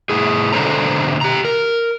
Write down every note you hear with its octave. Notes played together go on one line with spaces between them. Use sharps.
A2 E4 G#4
B2 D3 D4 A4 C5 A#5
G4 A#5
A#4